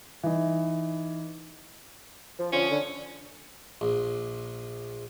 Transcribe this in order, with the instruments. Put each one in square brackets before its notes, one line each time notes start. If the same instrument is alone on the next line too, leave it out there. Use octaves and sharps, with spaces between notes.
[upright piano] E3 D#4
[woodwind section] F3
[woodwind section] D3 F3 [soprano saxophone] C#4
[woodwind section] D3
[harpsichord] A#1